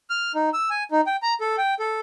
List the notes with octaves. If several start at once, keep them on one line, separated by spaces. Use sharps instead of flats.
F6
D#4
E6
G#5
D#4
G5
A#5
A4
G5
A4